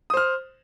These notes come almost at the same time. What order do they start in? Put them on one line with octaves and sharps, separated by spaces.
D#6 C5 F6